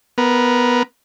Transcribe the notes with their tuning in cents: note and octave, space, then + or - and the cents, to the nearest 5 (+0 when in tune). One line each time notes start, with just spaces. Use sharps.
B3 +0 A#4 +15